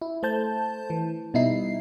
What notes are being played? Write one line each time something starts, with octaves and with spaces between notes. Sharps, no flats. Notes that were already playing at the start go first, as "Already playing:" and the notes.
E4
A3 C5 A5 G6
E3
B2 G3 D#4 E4 C7